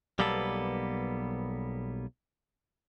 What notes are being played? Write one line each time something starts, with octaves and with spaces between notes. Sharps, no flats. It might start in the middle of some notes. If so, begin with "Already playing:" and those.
B1 G3 A#3 B3 A4